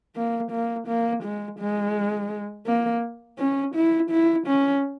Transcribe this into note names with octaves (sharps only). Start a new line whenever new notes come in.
A#3
A#3
A#3
G#3
G#3
A#3
C#4
E4
E4
C#4